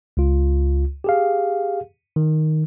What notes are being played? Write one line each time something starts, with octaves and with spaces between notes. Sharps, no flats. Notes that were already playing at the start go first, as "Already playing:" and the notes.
C#2 F4
G4 G#4 F5
D#3